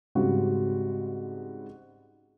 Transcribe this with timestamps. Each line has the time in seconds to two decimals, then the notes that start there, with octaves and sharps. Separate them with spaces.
0.15 G#2 C#3 G3 C4 F#4